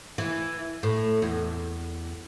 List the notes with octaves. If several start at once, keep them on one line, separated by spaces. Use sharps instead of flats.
E3
A2
E2